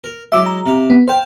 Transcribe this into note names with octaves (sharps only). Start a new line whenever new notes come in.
A#4
F#3 G#3 E4 E5 D6
A#5
C3 F5
B3
C5 F5 G5 A5